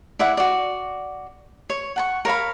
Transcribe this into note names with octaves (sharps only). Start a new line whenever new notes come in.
E4 D5 E5 F#5
F#4 D5
C#5
F#5 A5 C#6
A#4 C#5 F5 B5